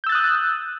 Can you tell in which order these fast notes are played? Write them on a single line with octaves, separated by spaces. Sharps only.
G6 E6 A6 F#6 D#6